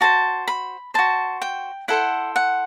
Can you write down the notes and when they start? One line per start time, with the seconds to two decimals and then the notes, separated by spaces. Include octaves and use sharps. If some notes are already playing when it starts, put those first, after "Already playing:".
0.01 F#4 C5 A5
0.48 B5
0.94 F#4 C5 A5
1.42 G5
1.88 E4 A4 C5 F#5
2.36 F#5